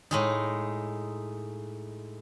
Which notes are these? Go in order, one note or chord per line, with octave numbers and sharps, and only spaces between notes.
A2 G#3 D#4